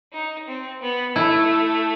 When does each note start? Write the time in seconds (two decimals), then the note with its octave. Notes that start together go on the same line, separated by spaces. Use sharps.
0.13 D#4
0.47 C4
0.81 B3
1.16 A3 E4